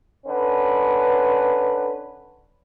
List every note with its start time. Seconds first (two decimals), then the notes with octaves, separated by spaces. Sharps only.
0.26 D3 C#4 B4